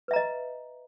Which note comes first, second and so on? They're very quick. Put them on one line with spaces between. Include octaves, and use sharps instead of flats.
B4 E5 A#5 D#5